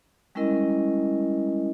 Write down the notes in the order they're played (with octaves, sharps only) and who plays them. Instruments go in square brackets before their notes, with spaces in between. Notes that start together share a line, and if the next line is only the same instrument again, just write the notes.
[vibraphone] G3 G#3 C#4 E4 A#4 D#5